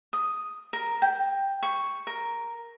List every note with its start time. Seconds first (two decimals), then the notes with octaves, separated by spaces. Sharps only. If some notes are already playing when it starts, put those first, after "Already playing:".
0.13 D#6
0.73 A#4
1.02 G5
1.63 C#6
2.07 A#4